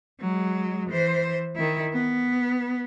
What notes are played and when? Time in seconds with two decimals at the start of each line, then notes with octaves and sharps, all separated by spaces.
0.20 F#3 G#3
0.90 E3 C5
1.56 D#3 E4
1.93 B3